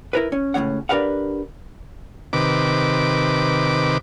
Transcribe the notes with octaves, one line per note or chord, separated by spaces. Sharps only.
E4 A#4 B4
C#4
C#2 A2 D#3 C#4 F#5
D4 G4 A#4 B4 F5 F#5
C3 D#3 B4 D6